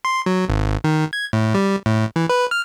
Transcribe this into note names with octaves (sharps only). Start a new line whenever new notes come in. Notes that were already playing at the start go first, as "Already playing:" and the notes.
C6
F#3
G#1
D#3
G#6
A2
G3
A2
E3
B4
F6